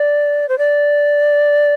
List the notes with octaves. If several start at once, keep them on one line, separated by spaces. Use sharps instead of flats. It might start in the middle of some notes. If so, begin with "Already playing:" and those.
Already playing: D5
C5
D5